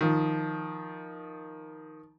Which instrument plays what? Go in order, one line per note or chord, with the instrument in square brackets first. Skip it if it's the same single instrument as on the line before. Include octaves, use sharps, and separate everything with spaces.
[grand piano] D#3 F3